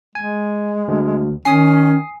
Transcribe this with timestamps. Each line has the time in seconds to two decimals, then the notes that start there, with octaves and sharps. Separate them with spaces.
0.15 G#3 G#5
0.88 D2
1.45 D#3 C#4 G#5 D#6 C7